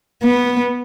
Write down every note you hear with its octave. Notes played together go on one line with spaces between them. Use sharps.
B3